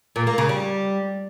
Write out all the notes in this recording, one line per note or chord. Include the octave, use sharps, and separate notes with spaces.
A#2
A#3
C#3
G3